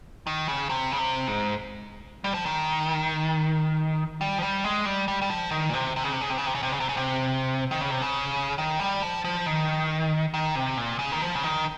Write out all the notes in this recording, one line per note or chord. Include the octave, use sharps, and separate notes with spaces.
D#3
C#3
C3
C#3
C3
G#2
G3
F3
D#3
G3
F3
G3
G#3
G3
G3
G3
F3
D#3
A#2
C3
C3
C#3
C3
C#3
C3
C#3
C3
C#3
C3
C#3
C3
C#3
C3
D#3
C#3
C3
C#3
D#3
G3
F3
F3
D#3
D#3
C3
A#2
C#3
D#3
F3
C#3
D#3